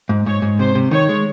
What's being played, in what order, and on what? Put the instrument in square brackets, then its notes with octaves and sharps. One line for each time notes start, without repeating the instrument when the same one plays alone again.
[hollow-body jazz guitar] G#2
[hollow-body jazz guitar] G#2 [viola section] C#5
[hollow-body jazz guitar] G#2
[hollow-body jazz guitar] C3 [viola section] C5
[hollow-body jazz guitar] C3
[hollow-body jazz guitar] D#3 [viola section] C#5
[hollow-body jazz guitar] G#3